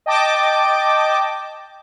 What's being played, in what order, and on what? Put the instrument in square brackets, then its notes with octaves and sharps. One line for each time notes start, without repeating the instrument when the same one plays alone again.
[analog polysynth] D#5 G5 A5 D6